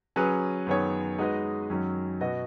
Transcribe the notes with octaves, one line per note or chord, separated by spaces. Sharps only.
F#3 C#4 G#4 B4
F#2 D#3 B3 G#4 C#5
G#3 D#4 F#4 B4 D#5
F#2 D#3 F#3 C#4
B2 B3 F#4 D#5